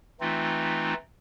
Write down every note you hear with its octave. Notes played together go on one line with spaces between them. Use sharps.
E3 A3 C4 D#4 F4